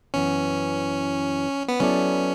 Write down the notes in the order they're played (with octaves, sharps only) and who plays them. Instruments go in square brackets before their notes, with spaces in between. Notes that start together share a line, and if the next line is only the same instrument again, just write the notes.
[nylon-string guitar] F#2 E3 B3 [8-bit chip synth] C#4
[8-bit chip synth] B3
[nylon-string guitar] F#3 B3 E4 A4 D5 [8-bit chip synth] C#4